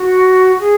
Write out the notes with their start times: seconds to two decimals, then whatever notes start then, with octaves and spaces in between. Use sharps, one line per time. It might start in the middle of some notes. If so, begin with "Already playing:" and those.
Already playing: F#4
0.60 G#4